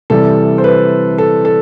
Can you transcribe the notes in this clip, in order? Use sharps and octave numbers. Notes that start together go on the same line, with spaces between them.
C3 E3 G3 A4
C5
B4
A4
A4